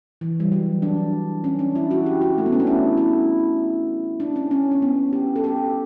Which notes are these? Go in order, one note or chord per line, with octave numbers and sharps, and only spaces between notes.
E3
G3
F#3
D4
C#4
D4
E4
F#4
G4
F#4
A3
B3
C#4
D4
E4
E4
D4
C#4
C#4
C#4
B3
G4
A4
G4